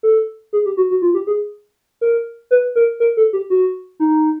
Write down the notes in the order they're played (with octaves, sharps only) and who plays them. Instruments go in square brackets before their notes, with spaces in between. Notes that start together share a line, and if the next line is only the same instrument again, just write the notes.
[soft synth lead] A4
G#4
G4
F#4
F#4
F4
G4
G#4
A#4
B4
A#4
A#4
A4
G4
F#4
D#4